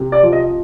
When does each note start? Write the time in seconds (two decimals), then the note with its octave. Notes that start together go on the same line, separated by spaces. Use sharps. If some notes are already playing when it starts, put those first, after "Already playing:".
Already playing: C3
0.12 D5
0.23 F3
0.33 D#5